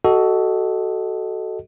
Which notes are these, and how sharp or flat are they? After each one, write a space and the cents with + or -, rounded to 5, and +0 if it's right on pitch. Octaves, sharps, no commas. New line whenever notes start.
F#4 +20 A4 -5 D#5 +0